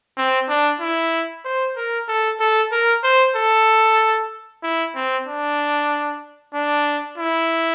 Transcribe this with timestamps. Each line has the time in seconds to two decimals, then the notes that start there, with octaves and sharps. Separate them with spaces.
0.17 C4
0.49 D4
0.81 E4
1.45 C5
1.77 A#4
2.08 A4
2.40 A4
2.72 A#4
3.04 C5
3.36 A4
4.63 E4
4.95 C4
5.27 D4
6.54 D4
7.18 E4